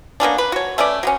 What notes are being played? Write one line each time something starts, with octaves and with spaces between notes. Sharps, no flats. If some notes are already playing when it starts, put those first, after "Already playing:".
A#3 B3 C#4 D4
B4
F#4 C#5
A3 C#4 B4 D5
F#3 B3 C#4